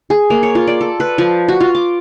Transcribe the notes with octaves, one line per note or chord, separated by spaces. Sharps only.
G#4
A#3
C#5
F4
D5
A4
B4
F3
F#4
F4
D6